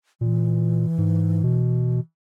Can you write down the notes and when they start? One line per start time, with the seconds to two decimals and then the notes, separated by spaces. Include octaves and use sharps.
0.21 A#2 E3
0.98 G#2
1.43 B2